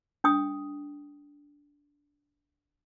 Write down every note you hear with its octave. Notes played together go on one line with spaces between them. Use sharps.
D4 G5 D#6